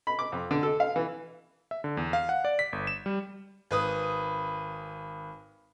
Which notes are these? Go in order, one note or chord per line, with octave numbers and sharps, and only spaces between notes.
B5
D6
F2
D3
A4
F5
E3
E5
D3
E2
F5
F#5
D5
B6
G1
E7
G3
G#1 B4 D#6